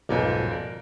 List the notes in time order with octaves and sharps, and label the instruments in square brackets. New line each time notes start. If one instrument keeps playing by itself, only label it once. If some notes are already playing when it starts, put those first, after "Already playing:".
[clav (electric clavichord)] B1 G#2 G#5 [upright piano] F2 F3 A#3
[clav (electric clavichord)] A#4 D5